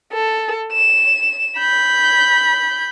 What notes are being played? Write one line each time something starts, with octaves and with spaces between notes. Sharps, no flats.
A4
E7
B5 G6